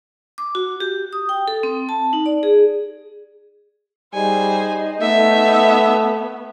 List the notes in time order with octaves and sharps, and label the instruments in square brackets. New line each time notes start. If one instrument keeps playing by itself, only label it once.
[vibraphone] D6
F#4
G4
D#6
G5
A4
C4
A5
D#4
D5
G#4
[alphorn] G3 [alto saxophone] D#4 [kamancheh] G#4 C5 [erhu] G#5
[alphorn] A3 [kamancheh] B3 [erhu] E5